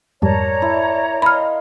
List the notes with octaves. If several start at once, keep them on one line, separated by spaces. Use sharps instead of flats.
F2 G#2 G3 A#4 C#5 D5 A5 A#5
E4
D#5 F5 B5 C6 F6